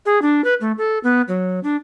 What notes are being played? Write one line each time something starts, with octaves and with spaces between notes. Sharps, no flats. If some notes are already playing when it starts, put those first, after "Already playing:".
G#4
D4
B4
A3
A4
B3
F#3
D4